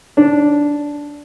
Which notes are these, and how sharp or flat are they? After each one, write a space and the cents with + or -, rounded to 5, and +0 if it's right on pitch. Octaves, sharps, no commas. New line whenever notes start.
D4 -10